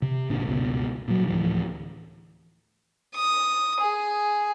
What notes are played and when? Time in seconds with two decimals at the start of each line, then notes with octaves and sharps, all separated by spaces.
0.02 C3
0.30 G#1 A#2 D3 D4
0.47 G1 C#2 B2
1.08 A#2 F#3
1.27 D2 A2 E3 F3
3.16 D#6
3.80 G#4